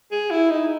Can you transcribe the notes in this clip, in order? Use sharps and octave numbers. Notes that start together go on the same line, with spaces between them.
G#4
E4
D#4